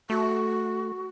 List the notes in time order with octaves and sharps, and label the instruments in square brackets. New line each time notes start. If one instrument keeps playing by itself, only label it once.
[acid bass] A3 [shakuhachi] F#4